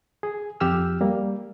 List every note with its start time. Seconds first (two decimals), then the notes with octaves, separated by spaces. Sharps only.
0.23 G#4
0.60 F2 G4 E6 F6
1.01 G3 A#3